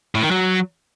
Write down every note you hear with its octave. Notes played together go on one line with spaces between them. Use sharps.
A2
D#3
F#3